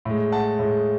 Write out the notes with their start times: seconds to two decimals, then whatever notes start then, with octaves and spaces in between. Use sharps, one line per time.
0.05 A2 G#3
0.32 F#5 A5
0.59 A2 G#3